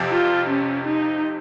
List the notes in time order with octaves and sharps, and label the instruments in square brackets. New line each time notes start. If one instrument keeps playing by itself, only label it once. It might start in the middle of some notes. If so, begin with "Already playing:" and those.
Already playing: [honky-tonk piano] F2 C3 F3
[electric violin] F4
C#4
D#4